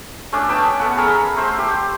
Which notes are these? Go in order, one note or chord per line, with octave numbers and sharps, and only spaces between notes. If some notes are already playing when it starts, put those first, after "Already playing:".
A3 C#4 D4
B4 G5 A5 D#6
B3 A4 F#5
G#4 A#4 A#5 B5
A3 C5 E6
G4